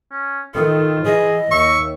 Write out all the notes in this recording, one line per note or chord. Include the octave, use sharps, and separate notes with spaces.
C#4
D#3 F4 A4
E3 G#4 D#5
D#2 E5 C#6